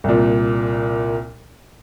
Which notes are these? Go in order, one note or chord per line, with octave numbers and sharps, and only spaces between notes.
C2 A#2